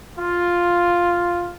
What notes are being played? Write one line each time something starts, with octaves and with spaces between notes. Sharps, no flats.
F4